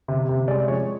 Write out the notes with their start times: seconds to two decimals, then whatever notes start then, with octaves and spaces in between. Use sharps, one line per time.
0.08 C3
0.29 C3
0.48 G#3 D5
0.68 F3 C#5